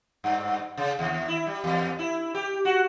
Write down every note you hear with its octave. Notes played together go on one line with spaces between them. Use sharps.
G2
C#3
D#2
E4
G3
E2
E4
G4
F#4